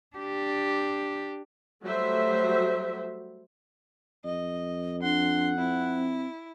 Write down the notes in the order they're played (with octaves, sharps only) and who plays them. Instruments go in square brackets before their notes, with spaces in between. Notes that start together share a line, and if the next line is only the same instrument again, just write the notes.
[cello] D4 G4
[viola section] F#3 G3 A3 F#4 C5 E5
[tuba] F2 [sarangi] D#5
[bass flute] D4 [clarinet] F#5 [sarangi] C6
[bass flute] C4 [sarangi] E4